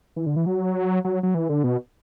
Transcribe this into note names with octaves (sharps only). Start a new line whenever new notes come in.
E3
D3
E3
F#3
F#3
F#3
E3
D3
B2